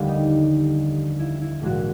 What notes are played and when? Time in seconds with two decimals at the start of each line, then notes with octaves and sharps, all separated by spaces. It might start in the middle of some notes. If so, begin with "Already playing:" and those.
Already playing: F1 D#2 D3 G3
0.08 D#4
1.19 E4
1.42 E4
1.62 A#1 G#2 E3 G#3 F#4